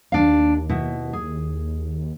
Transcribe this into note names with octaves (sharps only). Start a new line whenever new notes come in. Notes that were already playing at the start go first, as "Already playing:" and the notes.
D#2 D4 F5
B2 E4
G#4